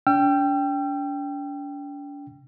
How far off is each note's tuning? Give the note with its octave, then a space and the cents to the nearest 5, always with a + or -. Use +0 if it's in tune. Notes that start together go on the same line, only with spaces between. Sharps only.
D4 -40 G5 +0 E6 +45